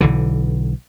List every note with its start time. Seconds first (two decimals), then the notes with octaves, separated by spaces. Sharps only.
0.01 B1 D3 E3